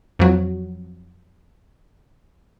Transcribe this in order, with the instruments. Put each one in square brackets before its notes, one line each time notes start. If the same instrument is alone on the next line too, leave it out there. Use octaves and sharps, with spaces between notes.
[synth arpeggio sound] F2 F#3